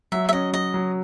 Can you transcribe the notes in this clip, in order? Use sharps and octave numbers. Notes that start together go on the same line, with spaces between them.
F#3 E5
E5
C#4 D#5
F#3 D#5
F#3